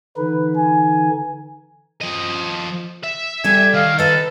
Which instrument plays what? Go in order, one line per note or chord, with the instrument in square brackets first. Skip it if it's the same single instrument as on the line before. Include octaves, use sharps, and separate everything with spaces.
[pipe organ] D3 E3 D#4 [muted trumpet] B4
[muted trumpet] G#5
[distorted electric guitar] F3 D#5
E5
[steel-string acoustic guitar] G3 G4 A4 [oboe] G#5
[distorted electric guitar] D#3 [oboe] F5
[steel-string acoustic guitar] D#4 B4 D#5 [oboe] A4